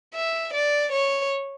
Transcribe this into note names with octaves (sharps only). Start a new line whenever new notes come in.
E5
D5
C#5